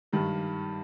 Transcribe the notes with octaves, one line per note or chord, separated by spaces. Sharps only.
G2 D#3 G3